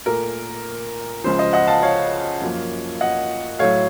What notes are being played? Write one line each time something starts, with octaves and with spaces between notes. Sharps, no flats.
A#2 A3 A#4
C#2 C#3 F3 C5
C5 D#5
D#5 F#5
F5 A5
C#5 F5
F#2 F3 A#3
D#5 F#5
A2 F#3 A3 C#5 F5